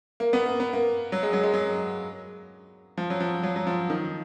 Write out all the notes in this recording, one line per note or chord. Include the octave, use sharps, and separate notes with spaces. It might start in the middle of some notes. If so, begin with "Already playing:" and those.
A#3
B3
A#3
B3
A#3
F#3
G#3
F#3
G#3
F#3
F3
F#3
F3
F#3
F#3
F3
D#3